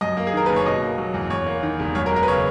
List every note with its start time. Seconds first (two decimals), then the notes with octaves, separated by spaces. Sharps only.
0.01 F#2 D#5
0.17 A#3
0.27 G#4
0.33 D#3 A#4
0.46 F#1 B4
0.56 C#5
0.66 B2 D#5
0.82 A#3
0.98 F#3
1.14 E2
1.30 E2 C#5
1.46 A#3
1.63 D#3
1.79 E1
1.95 F#2 C#5
2.06 A#4
2.11 G#3
2.16 A#4
2.23 B4
2.28 C#3 C#5